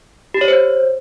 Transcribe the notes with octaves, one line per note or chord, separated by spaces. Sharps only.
G4
C#5
C5